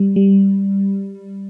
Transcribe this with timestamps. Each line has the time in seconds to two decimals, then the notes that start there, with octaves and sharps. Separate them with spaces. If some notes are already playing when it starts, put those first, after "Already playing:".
Already playing: G3
0.16 G3